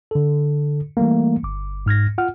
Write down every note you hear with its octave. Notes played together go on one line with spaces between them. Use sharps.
D3 A4
E3 G3 A3 A#3
G1 D6
G#2 F6 G#6 A#6
F4 F#5 F6